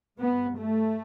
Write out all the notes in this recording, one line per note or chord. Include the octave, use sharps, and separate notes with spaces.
G2 B3
A3